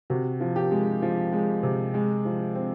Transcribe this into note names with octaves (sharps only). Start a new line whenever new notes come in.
C3 F#4
F3
G4
G#3
F3
G#3
C3
G#3
F3
C4